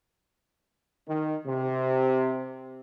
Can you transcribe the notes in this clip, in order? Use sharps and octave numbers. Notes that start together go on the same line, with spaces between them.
D#3
C3